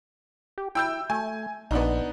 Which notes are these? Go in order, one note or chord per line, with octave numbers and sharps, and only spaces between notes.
G4
E4 G5 E6 G6
A3 G#5
A#1 B3 D4 D#4